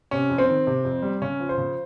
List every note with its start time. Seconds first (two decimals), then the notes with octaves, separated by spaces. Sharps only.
0.11 C3 C#4
0.30 F2
0.38 C4
0.48 D#3
0.67 C3
0.85 F2
1.02 G3
1.22 C#3 C#4
1.40 F3
1.49 C5
1.57 C#3